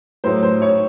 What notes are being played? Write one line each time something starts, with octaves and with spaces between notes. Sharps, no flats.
A2 F#3 C5
C5
C#5